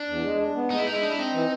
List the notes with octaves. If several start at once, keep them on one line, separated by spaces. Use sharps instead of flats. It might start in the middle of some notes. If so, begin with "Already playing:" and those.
Already playing: D4
E2
G#3
D4
B3
G#3 D#4
E4
G#3 D#4
E4
D4 D#4
E4
C4 D#4
E3